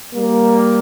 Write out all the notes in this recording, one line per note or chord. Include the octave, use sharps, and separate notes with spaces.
G3 A#3